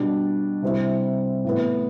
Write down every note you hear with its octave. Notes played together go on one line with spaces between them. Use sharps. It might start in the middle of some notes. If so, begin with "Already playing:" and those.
Already playing: B2 G3 D4
C3 G3 C4 E4
A2 E3 B3